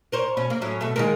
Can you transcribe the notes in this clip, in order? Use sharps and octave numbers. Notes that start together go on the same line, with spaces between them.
A#4 C5 C#5
B2 C#4
A#3
A2 F#3 C#4
B2 A3
D#3 G#3 A#3